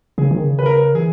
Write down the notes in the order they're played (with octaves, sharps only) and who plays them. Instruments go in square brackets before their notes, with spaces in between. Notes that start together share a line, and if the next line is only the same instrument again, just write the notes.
[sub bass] C#3 [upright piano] G#4
[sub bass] D#3
C#3
[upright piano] B4
A#4
A#4
[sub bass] E3 [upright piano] G#4